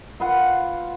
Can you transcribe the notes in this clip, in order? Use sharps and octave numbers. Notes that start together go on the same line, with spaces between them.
F4 B4 F5 F#5